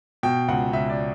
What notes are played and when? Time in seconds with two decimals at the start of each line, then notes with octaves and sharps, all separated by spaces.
0.23 B2 G5
0.48 C#2 F#5
0.73 C#2 E5
0.90 D5